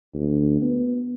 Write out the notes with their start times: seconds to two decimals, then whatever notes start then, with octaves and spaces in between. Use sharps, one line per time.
0.14 D2
0.62 B3